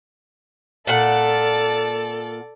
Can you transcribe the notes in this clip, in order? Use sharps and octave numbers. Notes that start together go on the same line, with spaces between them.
A#2 A4 D5 F#5